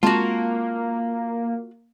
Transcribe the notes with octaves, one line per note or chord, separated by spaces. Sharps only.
G#3 A#3 C4 F4 F#4 A5